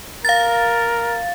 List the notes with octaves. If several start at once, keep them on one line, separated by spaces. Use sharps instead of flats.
A#4 F5 A6